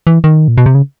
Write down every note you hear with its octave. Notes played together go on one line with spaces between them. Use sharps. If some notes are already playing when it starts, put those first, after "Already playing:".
E3
D#3
A#2
B2
C3
C#3